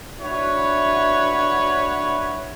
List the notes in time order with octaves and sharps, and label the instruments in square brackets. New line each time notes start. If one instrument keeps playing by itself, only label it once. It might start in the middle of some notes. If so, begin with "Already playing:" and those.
[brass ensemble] D4 E4 F#4 B4 C#5